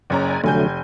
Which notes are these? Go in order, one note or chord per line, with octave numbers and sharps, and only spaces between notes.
F#1 C#4 D5 G#5 A#5
F1 D3 F#3 A3 G#5 G6